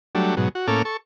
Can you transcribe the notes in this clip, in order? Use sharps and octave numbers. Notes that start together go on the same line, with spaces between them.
F#3 G3 A3 D4
G#2 B2 F#3
F#4
A2 A#3 C#4 A4 D6 F6
A4 C#6